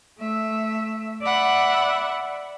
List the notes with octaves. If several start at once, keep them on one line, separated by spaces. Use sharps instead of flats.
A3 E5
D5 E5 F#5 B5